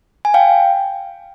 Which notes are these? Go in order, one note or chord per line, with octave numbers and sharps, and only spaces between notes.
G#5
F5 G5